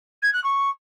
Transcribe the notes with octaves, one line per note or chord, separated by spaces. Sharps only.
G#6
F#6
C#6